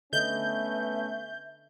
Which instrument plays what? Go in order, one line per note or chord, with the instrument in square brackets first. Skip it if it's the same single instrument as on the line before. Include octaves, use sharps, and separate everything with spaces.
[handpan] D3 A4 D#5 [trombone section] A3 B3 C#4 [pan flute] E5 [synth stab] G6